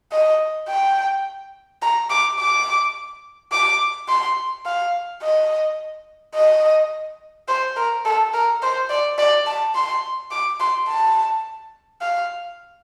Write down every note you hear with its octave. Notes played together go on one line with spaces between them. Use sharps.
D#5
G5
A#5
D6
D6
D6
C6
F5
D#5
D#5
C5
A#4
A4
A#4
C5
D5
D5
A5
C6
D6
C6
A5
F5